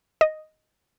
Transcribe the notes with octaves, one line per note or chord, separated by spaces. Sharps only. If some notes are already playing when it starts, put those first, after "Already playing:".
D#5